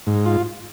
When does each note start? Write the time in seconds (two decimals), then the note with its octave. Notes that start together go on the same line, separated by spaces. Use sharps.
0.07 G#2
0.26 F4